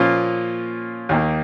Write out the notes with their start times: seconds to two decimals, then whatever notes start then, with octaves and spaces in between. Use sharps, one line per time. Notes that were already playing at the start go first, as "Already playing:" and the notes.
Already playing: A#2 F3 A#3 C#4 F4
1.09 D#2 D#3 A#3